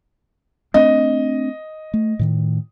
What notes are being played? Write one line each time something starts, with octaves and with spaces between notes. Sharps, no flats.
A3 C4 D4 D#5
A3
A2 D#3